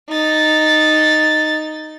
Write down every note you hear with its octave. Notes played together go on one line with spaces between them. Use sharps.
D#4 A6